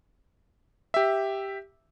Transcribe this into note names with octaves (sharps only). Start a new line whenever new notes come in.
G4 E5